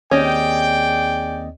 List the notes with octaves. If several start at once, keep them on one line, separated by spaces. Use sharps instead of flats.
D#2 C4 C#4 G#4 D5 D#5 G5